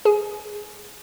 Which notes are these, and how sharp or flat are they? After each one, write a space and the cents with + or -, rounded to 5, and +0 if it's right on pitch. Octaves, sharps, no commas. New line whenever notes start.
G#4 +0 G#5 +30